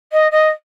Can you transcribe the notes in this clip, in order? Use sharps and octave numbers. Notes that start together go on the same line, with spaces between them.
D#5
D#5